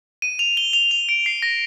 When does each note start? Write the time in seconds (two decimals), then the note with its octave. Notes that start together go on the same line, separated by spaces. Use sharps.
0.22 D#7
0.39 F7
0.57 G7
0.73 F7
0.91 F7
1.09 D7
1.26 C7
1.42 A#6